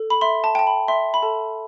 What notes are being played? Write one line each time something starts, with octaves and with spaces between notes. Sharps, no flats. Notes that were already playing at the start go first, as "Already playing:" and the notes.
Already playing: A4
B5
E5 C6
A5
G5 A5
B5
E5 C6
B5
A4 A5